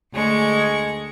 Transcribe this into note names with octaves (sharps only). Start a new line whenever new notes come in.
D2 G#3 C#6